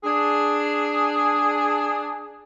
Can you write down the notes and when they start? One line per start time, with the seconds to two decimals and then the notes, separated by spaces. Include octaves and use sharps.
0.04 D4 G#4